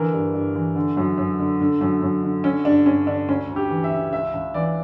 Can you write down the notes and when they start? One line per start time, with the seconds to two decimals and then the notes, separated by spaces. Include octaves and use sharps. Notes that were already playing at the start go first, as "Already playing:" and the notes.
Already playing: D3 E3 A#4
0.13 G2
0.34 G2
0.55 E3
0.76 D3
0.97 F#2
1.18 F#2
1.39 D3
1.60 D3
1.81 F#2
2.02 F#2
2.23 D3
2.44 D3 C#4
2.65 G2 D4
2.86 G2 C#4
3.07 D3 D4
3.28 D2 C#4
3.49 D2
3.56 G4
3.70 E3
3.84 E5
3.91 C#3
4.12 C#2 E5
4.34 C#2
4.54 E3 D5